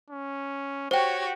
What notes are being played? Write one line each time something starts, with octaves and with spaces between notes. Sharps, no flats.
C#4
F#4 G4 C5 C#5 G5